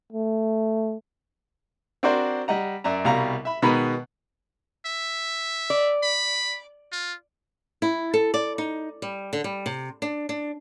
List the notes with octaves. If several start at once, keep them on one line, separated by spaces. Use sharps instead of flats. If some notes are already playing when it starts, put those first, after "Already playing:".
A3
C4 D4 F#4 A#4 C5 D5
G3 D#5 F#5 A#5
F#2 D5 E5 A#5
C2 B2 G3 F5 A#5
E5 B5
B2 D#3 G#3 B3 A#5 B5
E5
D5
B5
F4
E4
A4
D5
D#4
G3
D3
G3
C3
D4
D4